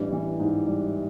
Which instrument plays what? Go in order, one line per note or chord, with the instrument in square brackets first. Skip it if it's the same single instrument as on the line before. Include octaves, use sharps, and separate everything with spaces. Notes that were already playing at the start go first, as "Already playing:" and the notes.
Already playing: [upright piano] A1 E3 G3 [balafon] D4
[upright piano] E3
G#2
G3